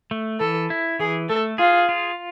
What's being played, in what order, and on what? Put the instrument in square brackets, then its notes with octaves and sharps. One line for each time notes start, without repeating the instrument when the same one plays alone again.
[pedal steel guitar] A3
[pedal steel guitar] E3 [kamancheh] A4
[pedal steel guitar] E4
[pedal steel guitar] E3 [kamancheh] G#4
[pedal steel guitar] A3 [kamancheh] A4
[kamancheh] F4 [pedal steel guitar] G#4
[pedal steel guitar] F4